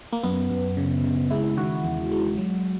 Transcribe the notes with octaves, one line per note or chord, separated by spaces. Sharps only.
A#3
F#2 B3
F#2
C#3
C#3
G#3 E4
D#3 F#4
E2
G#3
F#3